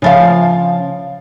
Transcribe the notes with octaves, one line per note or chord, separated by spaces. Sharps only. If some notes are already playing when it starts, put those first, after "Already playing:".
C#3 F3 F5